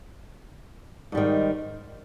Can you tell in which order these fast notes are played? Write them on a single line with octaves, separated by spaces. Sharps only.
G#2 G3 D#3